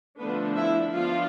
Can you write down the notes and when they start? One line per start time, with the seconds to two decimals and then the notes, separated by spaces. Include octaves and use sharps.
0.19 D3 F3 A3 B3 D4 B4
0.56 E4 E5
0.92 F3 B3 D4 F4 F5